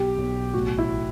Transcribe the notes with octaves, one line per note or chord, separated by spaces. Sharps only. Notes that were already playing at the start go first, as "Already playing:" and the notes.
Already playing: B1 G4
B1
A1 F#4
E4